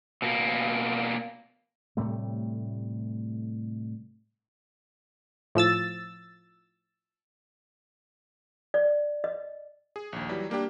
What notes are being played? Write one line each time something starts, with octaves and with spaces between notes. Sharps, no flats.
B2 A#3
A2 C3 G3 A3
A2 F3 E6 A6
D5
D#5
G#4
A#1 D#2
E3 F#3 G3
G3 A#3 D4 G4